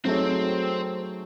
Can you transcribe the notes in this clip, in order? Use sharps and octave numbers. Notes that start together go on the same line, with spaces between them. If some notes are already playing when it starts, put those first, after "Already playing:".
F#3 A3 C4 D#4 G#4 C#5